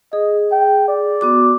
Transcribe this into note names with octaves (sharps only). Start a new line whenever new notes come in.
G#4 D#5
G5
D5
B3 F#4 D6